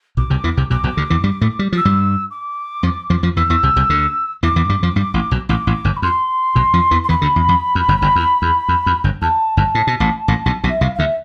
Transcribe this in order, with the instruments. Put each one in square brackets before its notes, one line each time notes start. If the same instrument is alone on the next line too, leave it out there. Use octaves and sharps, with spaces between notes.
[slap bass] B1 B2 [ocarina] D6
[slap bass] C2 C3
E2 E3
C2 C3
[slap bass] B1 B2 [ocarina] D6
[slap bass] B1 B2
D2 D3
E2 E3
G2 G3
A2 A3
G3
[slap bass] F3 [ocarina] E6
[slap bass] G2 G3
[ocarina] D6
[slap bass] F2 F3
F2 F3
F2 F3
[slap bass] E2 E3 [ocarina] E6
[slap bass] E2 E3
C2 C3
C2 C3
D2 D3
[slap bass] E2 E3 [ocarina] D6
[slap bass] E2 E3
G2 G3
F2 F3
G2 G3
A1 A2
B1 B2
[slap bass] A1 A2 [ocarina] D6
[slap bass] A1 A2
G1 G2
[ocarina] B5
[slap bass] F2 [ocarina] C6
[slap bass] B1 B2
F2 F3
E2 E3
[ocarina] C6
[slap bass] E2 E3 [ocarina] B5
[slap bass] D2 D3
E2
F2
F2
G1 G2
G1 G2
E2
E2
F2
F2
G1 G2
[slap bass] E2 [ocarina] A5
[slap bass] G1 G2
A2
B2
A1 A2
A1 A2
B1 B2
B1 B2
[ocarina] E5
[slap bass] C2 C3 [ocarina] F5
[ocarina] F5
[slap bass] D2 D3 [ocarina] E5